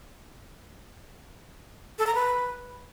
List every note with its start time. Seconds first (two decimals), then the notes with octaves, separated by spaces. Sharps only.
1.99 A4
2.07 A#5
2.15 B4